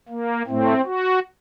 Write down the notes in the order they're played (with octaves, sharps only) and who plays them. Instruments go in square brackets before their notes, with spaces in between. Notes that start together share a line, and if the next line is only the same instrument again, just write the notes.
[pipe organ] A#3
A2 A3 C4
F#4